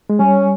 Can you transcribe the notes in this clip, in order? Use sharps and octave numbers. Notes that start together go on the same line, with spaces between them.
G#3
G3 C#4